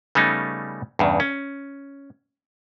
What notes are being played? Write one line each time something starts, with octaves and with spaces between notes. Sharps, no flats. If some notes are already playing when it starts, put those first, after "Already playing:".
C#3 G3 A3 B3 C#4 D#4
E2 G2 C#3
C#4